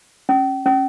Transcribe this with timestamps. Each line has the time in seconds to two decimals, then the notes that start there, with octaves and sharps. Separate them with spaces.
0.29 C#4
0.66 C#4